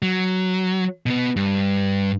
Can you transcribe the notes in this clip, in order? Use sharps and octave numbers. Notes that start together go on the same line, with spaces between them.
F#3
B2 B3
G2